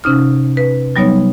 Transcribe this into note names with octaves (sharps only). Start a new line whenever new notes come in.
C3 C#4 D#4 F6
B4
F#3 G3 B3 D#4 C#5